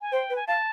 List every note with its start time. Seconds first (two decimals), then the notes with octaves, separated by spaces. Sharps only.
0.01 G#5
0.12 C5 G5
0.30 B4
0.36 G#5
0.47 F5 A5